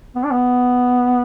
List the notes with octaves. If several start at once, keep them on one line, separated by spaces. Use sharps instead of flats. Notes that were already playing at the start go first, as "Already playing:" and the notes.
B3
D4
B3